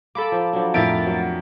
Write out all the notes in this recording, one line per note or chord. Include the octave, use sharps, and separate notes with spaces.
A#3 A4 B5 D6
F3
F3 F#3 D4
F2 A2 E4 A#4 E5 A6 D7
B2 F#3